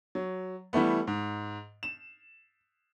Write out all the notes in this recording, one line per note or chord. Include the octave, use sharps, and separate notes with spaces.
F#3
E3 G3 A3 B3
G#2
E7